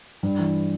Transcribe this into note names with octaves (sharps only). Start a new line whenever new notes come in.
G2
E3